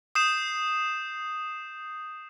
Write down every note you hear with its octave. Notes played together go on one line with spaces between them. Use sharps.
D#6 G6 C7 E7